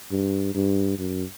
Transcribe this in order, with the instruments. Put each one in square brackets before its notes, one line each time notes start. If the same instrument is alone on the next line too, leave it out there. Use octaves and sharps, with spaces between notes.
[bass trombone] G2
G2
F#2